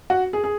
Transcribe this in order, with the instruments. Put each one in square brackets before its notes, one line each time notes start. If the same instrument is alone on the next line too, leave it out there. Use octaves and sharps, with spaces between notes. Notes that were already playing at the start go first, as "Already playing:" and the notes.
[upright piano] F#4
G#4
G#4